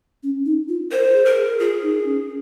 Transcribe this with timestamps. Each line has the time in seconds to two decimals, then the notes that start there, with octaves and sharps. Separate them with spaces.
0.23 C#4
0.46 D#4
0.68 F4
0.91 A#4 C5
1.14 G#4
1.25 A#4
1.36 G#4
1.59 F4 G#4
1.83 D#4
2.05 C#4